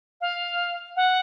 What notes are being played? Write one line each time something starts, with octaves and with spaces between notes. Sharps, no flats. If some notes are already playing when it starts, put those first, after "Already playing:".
F5
F#5